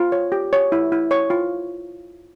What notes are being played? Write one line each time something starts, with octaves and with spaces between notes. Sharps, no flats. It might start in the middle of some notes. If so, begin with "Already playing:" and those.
Already playing: F4
C#5
G4
C#5
E4
E4
C#5 C#6
F4